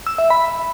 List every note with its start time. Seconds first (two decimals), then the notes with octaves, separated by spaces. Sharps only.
0.07 E6
0.18 E5
0.30 B5